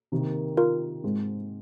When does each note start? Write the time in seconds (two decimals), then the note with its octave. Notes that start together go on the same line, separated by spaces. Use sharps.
0.12 C3 D#3 A#3
0.57 F4 A#4
1.04 G#2 G#3 C4